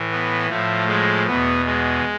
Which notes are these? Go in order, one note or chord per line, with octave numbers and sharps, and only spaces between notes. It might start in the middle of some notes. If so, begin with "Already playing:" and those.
Already playing: A2 E3
B3
A2 F3 A3
G#3
E2 B2 B3
G#3